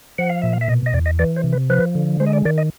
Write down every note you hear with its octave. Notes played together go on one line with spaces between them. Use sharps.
F3 F#5
F5
A#2 E5
F5
E5
B2 D#5
D#5
E2 D5
D#5
E3 D5
C5
C3
B4
F3 B4
D3
G#3 C5
D#5
D5
D#3 D5
D#5